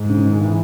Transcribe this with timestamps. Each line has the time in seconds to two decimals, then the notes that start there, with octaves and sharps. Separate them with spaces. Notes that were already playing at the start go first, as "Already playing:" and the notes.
Already playing: G#2
0.09 C#3
0.25 D#3
0.41 E3